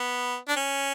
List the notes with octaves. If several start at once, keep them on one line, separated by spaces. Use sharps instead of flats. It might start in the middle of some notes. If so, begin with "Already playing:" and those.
Already playing: B3
D4
C#4